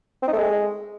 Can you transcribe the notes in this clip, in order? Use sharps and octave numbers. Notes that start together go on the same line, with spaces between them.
C4
D#4
A3
G#3